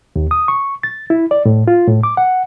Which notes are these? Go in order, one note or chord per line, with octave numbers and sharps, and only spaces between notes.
D#2
D#6
C#6
A6
E4
D5
A2
F4
A2
D6
F#5